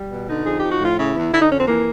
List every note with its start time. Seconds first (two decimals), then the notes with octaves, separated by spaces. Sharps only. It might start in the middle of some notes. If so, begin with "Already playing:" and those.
Already playing: G3
0.11 B2
0.28 D3 D#4
0.44 F2 G#4
0.58 G4
0.63 F3
0.71 F#4
0.80 A2 F4
0.97 C#3 E4
1.15 E2
1.32 D3 E4
1.41 D#4
1.49 F2 C#4
1.58 C4
1.67 E3 A#3